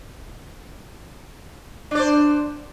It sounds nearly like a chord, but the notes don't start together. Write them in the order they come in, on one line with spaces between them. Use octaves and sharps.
D4 D5 C5